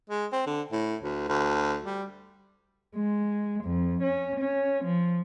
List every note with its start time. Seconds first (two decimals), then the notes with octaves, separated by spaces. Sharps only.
0.10 G#3
0.33 C4
0.46 D3
0.72 A2
1.03 D2
1.28 D2
1.85 G3
2.96 G#3
3.64 F2
4.03 C#4
4.40 C#4
4.84 F3